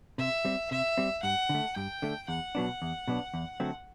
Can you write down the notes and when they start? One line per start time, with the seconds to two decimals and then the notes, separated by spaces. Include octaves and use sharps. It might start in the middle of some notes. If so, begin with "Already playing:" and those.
0.18 C3 E5
0.45 G3 C4
0.70 C3 E5
0.98 G3 C4
1.23 G2 F#5
1.49 D3
1.54 A3
1.76 G2 G5
2.02 D3 A3
2.28 E2 F#5
2.55 B2 F#3 B3 D4
2.82 E2
3.08 B2 F#3 B3 D4
3.34 E2
3.60 D3 F#3 A3 C4